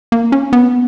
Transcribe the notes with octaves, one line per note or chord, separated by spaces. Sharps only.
A#3
C#4
B3